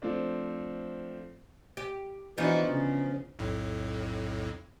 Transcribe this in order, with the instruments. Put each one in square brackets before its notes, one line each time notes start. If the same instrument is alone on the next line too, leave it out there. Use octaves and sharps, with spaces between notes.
[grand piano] F3 A3 C4 D4
[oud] G4
[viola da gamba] E3 D4 F#4 [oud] F3 B3 D#4
[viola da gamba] C#3
[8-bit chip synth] B1 F2 A2